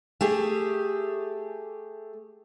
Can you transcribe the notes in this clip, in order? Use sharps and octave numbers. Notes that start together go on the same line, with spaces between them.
A3 G4 G#4